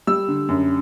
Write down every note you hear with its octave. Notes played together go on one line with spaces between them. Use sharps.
G3 E6
D3
F#2